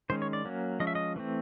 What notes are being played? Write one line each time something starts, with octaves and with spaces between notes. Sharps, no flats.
D#3 G#3 C#4 C5
C#5
D5
F#3 A#3 C#4
F3 G#3 C#4 D#5
E5
D#5
E3 A3 C4